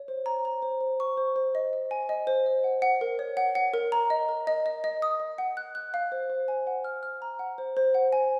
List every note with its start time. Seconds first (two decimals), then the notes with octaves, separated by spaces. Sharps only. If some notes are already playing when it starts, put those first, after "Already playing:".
Already playing: C#5
0.08 C5
0.26 A#5
0.45 A#5
0.62 C5
0.81 C5
1.00 C#6
1.17 C5
1.36 C5
1.55 D#5
1.73 D#5
1.91 G#5
2.09 D#5
2.27 C5
2.46 D#5
2.64 F#5
2.82 F#5
3.01 A#4
3.19 C#5
3.37 F#5
3.55 F#5
3.74 A#4
3.92 A#5
4.10 D#5
4.29 A#4
4.47 D#5
4.66 D#5
4.84 D#5
5.02 D#6
5.20 D#5
5.38 F#5
5.57 F#6
5.75 F#6
5.94 F5
6.12 C5
6.30 C5
6.48 G#5
6.67 F#5
6.85 F6
7.03 F6
7.22 A#5
7.39 F#5
7.58 C5
7.77 C5
7.94 F#5
8.13 G#5